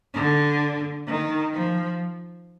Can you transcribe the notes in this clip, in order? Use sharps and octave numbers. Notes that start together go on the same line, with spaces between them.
D3
D#3
F3